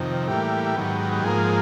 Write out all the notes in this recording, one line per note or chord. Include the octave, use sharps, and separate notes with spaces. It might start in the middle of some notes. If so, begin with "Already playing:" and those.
Already playing: F2 C3 D#3
A2 E3 G3 A#3 G4
G#2 D#3 F#3 B3
G4
G#2 F3 A#3 G#4